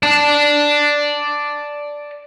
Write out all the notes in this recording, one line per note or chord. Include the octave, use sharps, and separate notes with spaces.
D5 A5